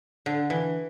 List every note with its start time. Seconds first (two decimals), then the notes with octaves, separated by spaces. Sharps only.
0.26 D3
0.50 E3